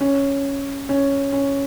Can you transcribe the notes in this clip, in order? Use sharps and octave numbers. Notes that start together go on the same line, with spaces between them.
C#4
C#4
C#4